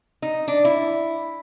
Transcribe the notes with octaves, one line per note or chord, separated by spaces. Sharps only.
D#4
D4
E4